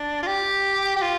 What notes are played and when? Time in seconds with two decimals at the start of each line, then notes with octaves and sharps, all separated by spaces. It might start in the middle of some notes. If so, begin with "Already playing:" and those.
Already playing: D4
0.23 F4
0.27 G4
0.96 G4
1.02 F4